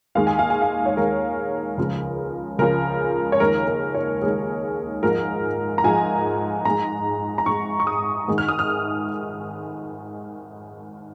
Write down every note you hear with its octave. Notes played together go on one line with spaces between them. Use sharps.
D#2 D#3 G#3 F5
G#5
F5
G#5
F5
C#5
D#2 D#3 G#3 A#4
C#2 C#3 F3 G#3
C#2 C#3 F3 G#3 A#4
C#5
D#2 D#3 G#3 A#4
A#4
C#5
D#2 D#3 G#3 G#4
G#2 F3 G#3 A#4
A#5
G#2 F3 G#3 G#5
G#2 G#3 A#5
A#5
G#2 G#3 C#6
C#6
D#6
G#2 D#3 G#3
F6
D#6
F6